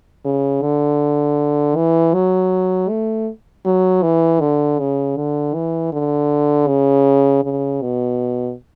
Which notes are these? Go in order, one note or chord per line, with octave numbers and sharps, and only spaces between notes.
C#3
D3
E3
F#3
A3
F#3
E3
D3
C#3
D3
E3
D3
C#3
C#3
B2